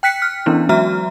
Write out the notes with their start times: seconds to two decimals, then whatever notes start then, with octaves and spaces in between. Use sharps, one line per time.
0.03 G5 F#6 B6 C#7
0.22 F6
0.46 E3 B3 C#4 D4 E4
0.69 F#3 G#3 F#4 E5 A#5 F6